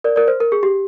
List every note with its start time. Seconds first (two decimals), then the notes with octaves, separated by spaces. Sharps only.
0.04 A#4 D5
0.16 A#4 D5
0.28 C5
0.40 A#4
0.52 G#4
0.63 G4